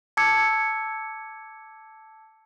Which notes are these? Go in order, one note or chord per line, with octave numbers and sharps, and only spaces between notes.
A5 D6 E6 G#6 C#7